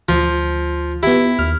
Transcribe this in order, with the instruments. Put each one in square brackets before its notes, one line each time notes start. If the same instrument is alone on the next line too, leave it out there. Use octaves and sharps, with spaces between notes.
[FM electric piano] D2 [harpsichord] F3 [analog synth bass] F4
[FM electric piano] B3 G4 [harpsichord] E4
[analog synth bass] D#2 [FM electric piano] F6